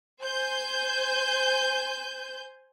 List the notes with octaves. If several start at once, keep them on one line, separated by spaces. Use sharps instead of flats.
C5 G#5 G6